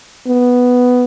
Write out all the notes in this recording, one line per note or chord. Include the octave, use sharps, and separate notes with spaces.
B3